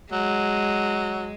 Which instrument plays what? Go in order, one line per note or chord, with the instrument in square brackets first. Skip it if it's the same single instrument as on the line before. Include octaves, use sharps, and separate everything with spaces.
[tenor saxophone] F#3 [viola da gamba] G#3